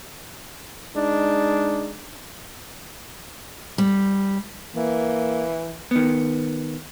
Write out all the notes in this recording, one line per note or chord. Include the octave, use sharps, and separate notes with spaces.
G#3 D4 D#4
G3
E3 A#3
D#3 B3